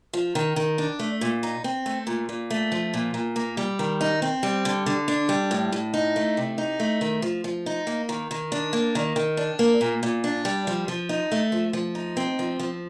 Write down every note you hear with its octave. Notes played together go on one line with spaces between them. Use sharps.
F3
D#3
D#3
D4
A3
A#2
D#4
C4
A3
A#2
A#2
A3
F3
A#2
A#2
A#3
G3
D#3
D#4
C4
G3
D3
D3
D4
G3
A2
A2
D#4
A3
C3
D#4
A3
D#3
F3
F3
D#4
A#3
D#3
D#3
D4
A#3
D#3
D#3
D4
A#3
A#2
A#2
D4
G3
F3
F3
D#4
A3
F3
F3
D#4
C4
F3
F3